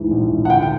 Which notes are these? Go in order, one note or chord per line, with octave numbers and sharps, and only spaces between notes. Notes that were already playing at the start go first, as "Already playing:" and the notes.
Already playing: D2 G#2 E3
A#1
A#1
F#5
D3 G5
G5